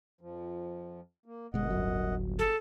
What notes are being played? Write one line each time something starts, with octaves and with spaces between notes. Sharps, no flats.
F2 F3
A#3
G1 F#2 B2 G#3 D#5 F#5
D1 C#2 F#3
G#4 A4